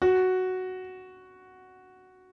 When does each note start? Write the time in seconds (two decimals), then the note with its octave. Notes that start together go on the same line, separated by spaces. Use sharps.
0.02 F#4